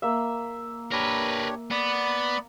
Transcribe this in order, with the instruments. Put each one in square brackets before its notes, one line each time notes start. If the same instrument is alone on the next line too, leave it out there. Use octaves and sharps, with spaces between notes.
[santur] A#3 E5
[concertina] D4 G4 C#5 [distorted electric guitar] A#4 B4
[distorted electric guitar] B3 [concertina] D5 B5